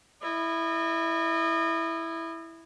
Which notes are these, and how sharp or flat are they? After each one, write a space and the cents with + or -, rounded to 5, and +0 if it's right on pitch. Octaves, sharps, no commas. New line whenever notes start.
E4 +0 D#5 -35